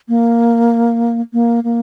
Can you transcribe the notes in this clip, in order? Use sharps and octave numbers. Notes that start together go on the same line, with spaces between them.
A#3
A#3
A#3